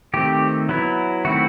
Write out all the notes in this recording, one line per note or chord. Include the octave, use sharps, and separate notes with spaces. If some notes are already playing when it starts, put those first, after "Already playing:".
D#3 A3 C4 G4
F#3 B3 E4
D#3 A3 C4 E4 F#4